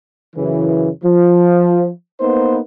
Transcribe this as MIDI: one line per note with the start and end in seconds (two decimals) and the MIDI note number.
0.36 0.89 42
0.36 0.89 49
0.36 0.89 52
1.04 1.87 53
2.20 2.58 58
2.20 2.58 59
2.20 2.58 63
2.20 2.58 71
2.20 2.58 72